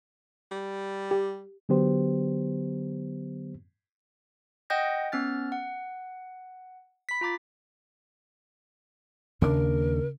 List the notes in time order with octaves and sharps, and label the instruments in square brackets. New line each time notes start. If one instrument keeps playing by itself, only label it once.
[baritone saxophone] G3
[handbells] G4
[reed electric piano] D3 F#3 B3 G4 C5
[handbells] D#5 F#5 G5 D#6 G6 A#6
B3 C#4 F6 A6
F#5
B5 B6
F4 A#5 D6 A6
[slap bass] D#2 A#3 D4 [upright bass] C#3 [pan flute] A#4